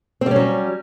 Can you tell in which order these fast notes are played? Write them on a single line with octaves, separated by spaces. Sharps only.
C4 G3 C#4 F#3